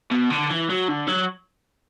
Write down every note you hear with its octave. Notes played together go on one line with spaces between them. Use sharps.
B2
D3
E3
F#3
D3
F#3